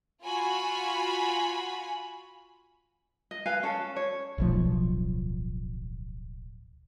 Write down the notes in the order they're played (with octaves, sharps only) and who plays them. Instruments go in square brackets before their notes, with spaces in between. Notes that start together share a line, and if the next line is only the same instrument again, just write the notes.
[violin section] F4 F#4 G#5 B5
[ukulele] D#5
B4 F5 G#5
C#4 A4
C#5
[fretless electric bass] D1 B1 F3